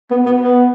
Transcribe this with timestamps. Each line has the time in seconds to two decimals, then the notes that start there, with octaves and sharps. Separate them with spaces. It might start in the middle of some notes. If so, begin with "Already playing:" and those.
0.11 B3
0.26 B3
0.41 B3